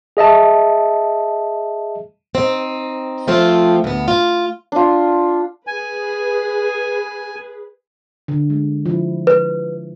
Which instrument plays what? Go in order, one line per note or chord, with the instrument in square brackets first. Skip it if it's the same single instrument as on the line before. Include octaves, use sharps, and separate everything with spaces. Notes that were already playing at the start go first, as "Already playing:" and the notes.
[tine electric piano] G#4 D#5 E5 A5
[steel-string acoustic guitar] C4 D#4
F3 A3 C4 F4
D2 B3
F4
[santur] D4 F4
[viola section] G#4 B4 [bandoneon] G#5
[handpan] D3
G#3
F3 E4
[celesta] B4